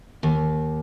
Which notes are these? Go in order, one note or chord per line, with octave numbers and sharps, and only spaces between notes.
D#2